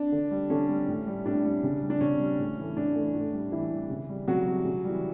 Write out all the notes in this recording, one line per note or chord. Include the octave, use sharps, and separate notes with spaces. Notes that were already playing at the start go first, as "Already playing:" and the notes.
Already playing: D4
D3
G3
D3 C#4
G3
A2
G3
A2 D4
G3
C#3
G3
D4
C#3 C#4
G3
A2
E3 A3
A2 D4
E3 A3
A2
G3
A2 E3 E4
G3
C#3
G3
C#3 F#3 F#4
G3
C#3
E3 G3